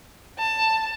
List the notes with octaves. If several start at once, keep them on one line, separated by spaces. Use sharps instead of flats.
A5